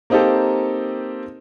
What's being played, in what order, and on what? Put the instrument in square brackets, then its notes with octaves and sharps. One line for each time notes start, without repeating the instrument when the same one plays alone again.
[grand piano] A#3 C4 D#4 G4 A4